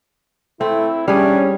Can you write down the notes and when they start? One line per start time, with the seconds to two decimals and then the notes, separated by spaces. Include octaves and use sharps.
0.61 A3 C4 E4
1.08 G3 C#4 D4 G#4